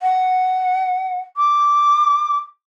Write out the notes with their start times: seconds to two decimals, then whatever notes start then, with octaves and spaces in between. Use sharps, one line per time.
0.02 F#5
1.37 D6